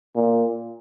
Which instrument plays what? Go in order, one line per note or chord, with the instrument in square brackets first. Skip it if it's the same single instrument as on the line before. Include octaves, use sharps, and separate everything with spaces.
[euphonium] A#2